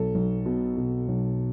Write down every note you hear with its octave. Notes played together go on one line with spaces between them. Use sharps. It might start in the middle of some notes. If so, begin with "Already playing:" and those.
Already playing: B1 B2 A4
B1
B2
B2
B1